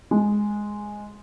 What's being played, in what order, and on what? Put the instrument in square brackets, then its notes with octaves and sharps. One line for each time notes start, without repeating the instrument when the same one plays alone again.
[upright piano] G#3